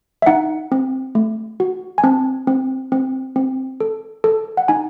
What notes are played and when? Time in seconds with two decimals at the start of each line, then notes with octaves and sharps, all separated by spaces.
0.22 E5
0.26 D#4 F#5
0.72 C4
1.15 A3
1.60 F#4
1.98 G#5
2.04 C4 A5
2.47 C4
2.92 C4
3.36 C4
3.80 A4
4.24 A4
4.57 F#5
4.68 D#4 G#5